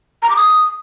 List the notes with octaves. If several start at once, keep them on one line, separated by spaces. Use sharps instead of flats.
A#5
D6
D#6